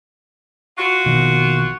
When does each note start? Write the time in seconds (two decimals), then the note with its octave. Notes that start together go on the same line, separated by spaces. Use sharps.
0.78 F4 F#4
1.06 A#1 B2 D#3